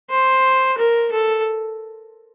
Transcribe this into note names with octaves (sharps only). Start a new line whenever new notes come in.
C5
A#4
A4